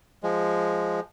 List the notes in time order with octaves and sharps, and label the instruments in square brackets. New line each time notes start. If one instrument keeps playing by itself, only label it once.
[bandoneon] F3 G#3